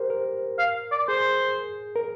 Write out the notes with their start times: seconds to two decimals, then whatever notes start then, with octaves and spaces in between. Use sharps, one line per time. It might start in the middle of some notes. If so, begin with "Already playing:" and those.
Already playing: G4 A#4 C5
0.10 A#4
0.59 F5
0.92 D5
1.08 G#4 C5
1.96 A#4